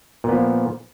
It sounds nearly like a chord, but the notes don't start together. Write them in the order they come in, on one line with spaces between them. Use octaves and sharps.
A#2 B3 F3